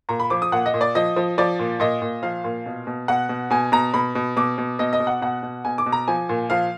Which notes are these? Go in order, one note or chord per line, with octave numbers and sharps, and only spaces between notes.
A#2 A#5
B5
F3 D6
D#6
A#2 F#5
D#5
A#2
D5
F3 D#5
F3
F3 D5
A#2
A#2 D#5
A#2
F3 F5
A#2
B2
B2
B2 F#5
B2
B2 G#5
B2 A#5
B2 B5
B2
B2 D6
B2
B2 D#5
D#5
B2
F#5
B2 F#5
B2
B2 G#5
D6
B2
A#5
F3 G#5
A#2
F3 F5